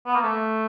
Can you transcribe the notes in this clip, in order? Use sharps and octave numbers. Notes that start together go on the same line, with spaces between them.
B3
A#3
A3